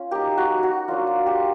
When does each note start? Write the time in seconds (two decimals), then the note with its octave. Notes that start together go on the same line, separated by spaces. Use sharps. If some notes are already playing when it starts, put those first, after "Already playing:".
Already playing: C#4 F4
0.11 A#3 D#4 G4
0.37 F#4
0.63 F#4
0.88 F#3 A#3 D4 F4
1.07 F4
1.26 G4